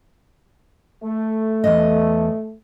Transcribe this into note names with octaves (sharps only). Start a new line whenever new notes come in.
A3
E2 B2 D#5